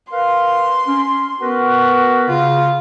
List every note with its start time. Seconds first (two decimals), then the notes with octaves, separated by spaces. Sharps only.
0.12 A#4 B4 F5 C6
0.87 C#4
1.41 B3 F#4 A#4 B4
2.29 C#3 F4